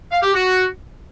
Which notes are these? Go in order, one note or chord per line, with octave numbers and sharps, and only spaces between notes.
F5
G4
F#4